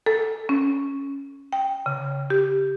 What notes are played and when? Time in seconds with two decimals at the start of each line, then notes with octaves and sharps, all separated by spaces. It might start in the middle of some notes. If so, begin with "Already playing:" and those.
0.06 A4
0.49 C#4
1.53 G5
1.86 C#3
2.30 G4